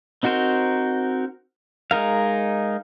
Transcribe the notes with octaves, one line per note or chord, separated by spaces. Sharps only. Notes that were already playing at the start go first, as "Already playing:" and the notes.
C4 D#4 F#4 A#4 C5
G#3 D#4 A#4 F5